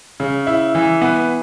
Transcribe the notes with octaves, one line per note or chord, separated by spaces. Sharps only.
C#3
E4
E3
B3